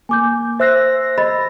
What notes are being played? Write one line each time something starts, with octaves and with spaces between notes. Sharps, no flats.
A#3 G#5 D6 G6
C5 E5 E6 F#6 A#6 C7
D#5 B5 A6